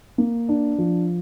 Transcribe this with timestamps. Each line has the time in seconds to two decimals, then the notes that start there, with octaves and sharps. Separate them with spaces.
0.18 A#3
0.49 D4
0.79 F3